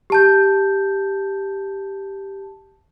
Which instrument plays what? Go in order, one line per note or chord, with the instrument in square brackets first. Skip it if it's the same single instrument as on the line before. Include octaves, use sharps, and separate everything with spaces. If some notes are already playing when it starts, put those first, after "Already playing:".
[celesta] G4 A5 G6